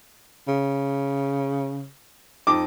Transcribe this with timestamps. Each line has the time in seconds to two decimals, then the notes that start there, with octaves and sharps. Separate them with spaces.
0.48 C#3
2.47 F2 D#4 D6